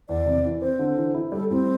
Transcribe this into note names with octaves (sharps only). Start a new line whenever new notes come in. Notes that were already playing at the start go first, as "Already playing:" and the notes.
E2 D5
C3
E3
C4 C5
D3
E3
E4
G3 A4
A2 C4